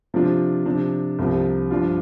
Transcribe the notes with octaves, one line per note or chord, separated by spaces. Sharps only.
C3 F3 D4 F4
C3 F3 D4
C2 C3 F3
G2 F3 D4 F4